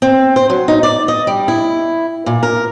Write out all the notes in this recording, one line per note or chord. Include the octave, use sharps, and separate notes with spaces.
C4
C5
F#3
D#4
D5
D#5
G3
E4
A#2
A#4